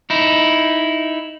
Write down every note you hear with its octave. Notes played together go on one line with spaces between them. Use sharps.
D#4 E4